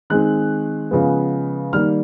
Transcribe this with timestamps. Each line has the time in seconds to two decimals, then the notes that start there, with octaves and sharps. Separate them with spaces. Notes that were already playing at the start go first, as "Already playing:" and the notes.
0.10 D#3 G#3 C4 F#6
0.91 C#3 F3 G#3 B3
1.73 D#3 G3 A#3 F6